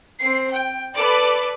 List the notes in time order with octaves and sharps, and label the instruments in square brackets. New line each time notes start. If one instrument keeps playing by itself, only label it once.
[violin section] C4 C7
G5
A4 B4 D5 D6